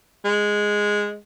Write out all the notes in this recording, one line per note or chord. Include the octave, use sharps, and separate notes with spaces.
G#3